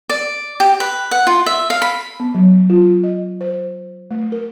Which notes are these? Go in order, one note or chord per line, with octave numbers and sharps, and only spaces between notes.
D5
G4
B4
F#5
F4
E5
F5
B5
B3
F#3
F4
D#5
C5
A3
A#4